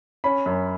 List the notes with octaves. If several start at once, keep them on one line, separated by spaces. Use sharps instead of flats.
C#4 B5
F#2